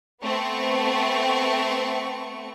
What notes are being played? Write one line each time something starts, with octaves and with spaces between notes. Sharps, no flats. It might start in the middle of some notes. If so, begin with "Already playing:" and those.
A3 B3 C4 C#6